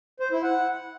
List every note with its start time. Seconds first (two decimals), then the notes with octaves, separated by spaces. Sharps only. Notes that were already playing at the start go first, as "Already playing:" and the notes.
0.20 C5
0.32 E4
0.43 F#5